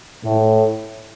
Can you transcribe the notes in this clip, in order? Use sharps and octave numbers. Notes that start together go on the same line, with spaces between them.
A2